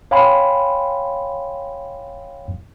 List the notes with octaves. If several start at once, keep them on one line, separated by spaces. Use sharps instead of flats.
C#5 F5 G5 G#5 B5 C6